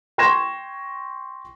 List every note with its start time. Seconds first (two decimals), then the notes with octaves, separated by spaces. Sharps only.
0.18 G5 C6 C#6 G#6 A#6 E7